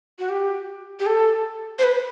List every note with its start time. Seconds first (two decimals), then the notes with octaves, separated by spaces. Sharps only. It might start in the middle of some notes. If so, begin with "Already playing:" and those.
0.19 F#4
0.29 G4
0.99 G4
1.06 A4
1.79 C5
1.84 B4